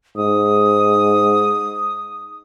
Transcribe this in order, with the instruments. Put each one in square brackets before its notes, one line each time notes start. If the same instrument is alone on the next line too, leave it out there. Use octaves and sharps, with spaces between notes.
[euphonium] G#2 [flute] D#6